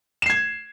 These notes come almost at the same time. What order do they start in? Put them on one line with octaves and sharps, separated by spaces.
E7 C7 G#6